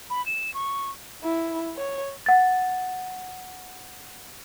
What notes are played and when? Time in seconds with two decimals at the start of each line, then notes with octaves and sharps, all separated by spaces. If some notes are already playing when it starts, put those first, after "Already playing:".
0.10 B5
0.26 E7
0.54 C#6
1.24 E4
1.77 C#5
2.26 F#5 A6